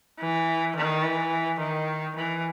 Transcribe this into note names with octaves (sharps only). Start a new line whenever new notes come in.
E3
D#3
E3
D#3
E3